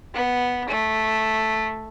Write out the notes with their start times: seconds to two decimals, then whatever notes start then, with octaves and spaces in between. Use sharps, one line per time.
0.14 B3
0.68 A3